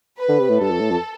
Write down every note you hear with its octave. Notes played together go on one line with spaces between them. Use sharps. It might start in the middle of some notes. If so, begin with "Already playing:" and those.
B4
D3
C3
A2
G2 A4
F2
A2
F2